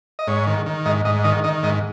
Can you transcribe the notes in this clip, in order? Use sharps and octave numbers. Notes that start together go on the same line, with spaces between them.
D#5
G#2 C#5
D#3
D#3
G#2 D#5
G#2 D#5
D#3 D#5
D#3 D#5
G#2 D#5